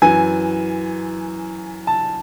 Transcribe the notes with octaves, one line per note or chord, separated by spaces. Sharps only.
F#2 E3 G#5
A5